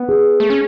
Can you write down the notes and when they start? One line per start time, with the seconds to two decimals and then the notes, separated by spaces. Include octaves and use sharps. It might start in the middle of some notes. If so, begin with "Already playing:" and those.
Already playing: B3
0.09 G#4
0.40 A3
0.50 C#4